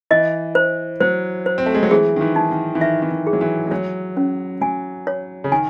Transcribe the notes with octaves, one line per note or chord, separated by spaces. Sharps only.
E3 D#5
C5
F#3 C5
C5
C4
A3
G#3
F#3
E3 G#4
D#3
E3
D#4
D#3
E3
D#3 E5
E3
D#3
G#4
F#3
E3
G#3
F#3 C#5
C#4
F#3 G#5
C#5
C#3
D#3 G#5